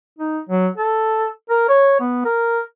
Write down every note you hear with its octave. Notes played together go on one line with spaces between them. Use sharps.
D#4
F#3
A4
A#4
C#5
B3
A#4